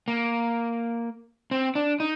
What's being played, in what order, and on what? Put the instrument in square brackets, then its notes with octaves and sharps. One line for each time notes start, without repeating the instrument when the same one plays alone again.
[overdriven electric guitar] A#3
C4
D4
D#4